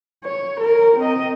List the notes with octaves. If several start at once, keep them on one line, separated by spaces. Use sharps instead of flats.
C#5
A#4
C4 D#5